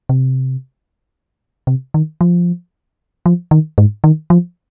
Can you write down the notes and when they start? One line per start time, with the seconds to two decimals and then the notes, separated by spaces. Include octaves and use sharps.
0.09 C3
1.67 C3
1.94 D#3
2.21 F3
3.26 F3
3.51 D#3
3.78 G#2
4.04 D#3
4.30 F3